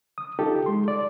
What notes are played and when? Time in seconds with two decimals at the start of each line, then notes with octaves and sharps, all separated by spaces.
0.18 D#6
0.39 D#4 F4 G4 A4
0.66 G#3 C6
0.88 D5